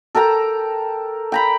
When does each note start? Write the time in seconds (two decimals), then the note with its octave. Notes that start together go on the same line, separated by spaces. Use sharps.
0.15 A4 A#4 G5 A#5
1.32 G5 A#5 B5